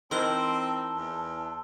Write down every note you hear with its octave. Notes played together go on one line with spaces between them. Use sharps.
E3 C4 D#4 A#4 A5 C6 E6 G7
E2